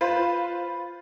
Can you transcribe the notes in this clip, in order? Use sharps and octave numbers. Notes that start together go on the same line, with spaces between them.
F4 B4 C5